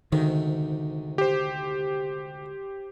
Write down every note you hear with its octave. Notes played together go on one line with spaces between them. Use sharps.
D2 G#2 C3 D#3
G4 C5